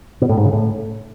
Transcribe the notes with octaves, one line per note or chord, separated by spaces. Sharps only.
B2
A2
G#2
C#3
A2